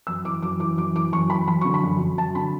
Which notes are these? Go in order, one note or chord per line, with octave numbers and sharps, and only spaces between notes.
F#2 E6
E3 D6
F#2 D6
E3 D6
F#2 D6
E3 D6
F#2 C#6
E3 B5
F#3 B5
D3 C#6
B5
F#2
F#2
F#3 A5
D3 B5